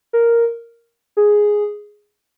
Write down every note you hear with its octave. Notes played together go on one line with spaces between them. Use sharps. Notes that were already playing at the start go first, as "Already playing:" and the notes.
A#4
G#4